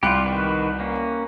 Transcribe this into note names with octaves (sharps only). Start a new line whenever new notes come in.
C2 F4 G4 F#6 C#7
D#3 F#4 B4
A#3 C#4